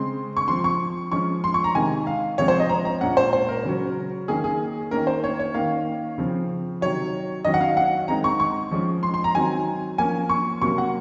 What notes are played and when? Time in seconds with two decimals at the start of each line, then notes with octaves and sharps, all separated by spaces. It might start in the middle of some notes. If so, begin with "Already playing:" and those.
Already playing: C#3 G#3 C4 C6
0.37 C#6
0.48 F3 C4 C6
0.64 C#6
1.12 F3 G#3 C#4 C#6
1.44 C6
1.54 C#6
1.64 A#5
1.75 C3 D#3 G#3 G#5
2.07 F5
2.38 C3 F3 G#3 C4 C#5
2.48 C5
2.60 D#5
2.69 A#5
2.85 A#5
3.01 A#2 G#3 C#4 F#5
3.17 C5
3.33 C5
3.49 A#4
3.64 C#3 F#3 C#4
4.28 D#3 A#3 C#4 G#4
4.44 G#4
4.91 D#3 A#3 C#4 A#4
5.07 C5
5.24 C#5
5.40 C#5
5.54 D#3 A#3 C#4 F5
6.18 C#3 F3 C4
6.81 C3 D#3 F#3 C#5
7.45 D#3 F#3 C#4 D#5
7.54 F#5
7.61 F5
7.77 F#5
8.08 D#3 G#3 C4 A#5
8.24 C#6
8.40 C#6
8.71 F3 G#3 C#4
9.03 C6
9.14 C6
9.24 A#5
9.35 D#3 F#3 C4 G#5
9.98 F3 A#3 C#4 G#5
10.29 C#6
10.62 C3 F#3 A#3 C#6
10.78 F#5